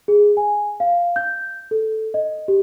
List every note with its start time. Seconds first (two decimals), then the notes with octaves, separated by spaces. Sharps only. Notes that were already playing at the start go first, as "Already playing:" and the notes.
0.08 G#4
0.37 G#5
0.80 F5
1.16 G6
1.71 A4
2.14 D#5
2.48 G4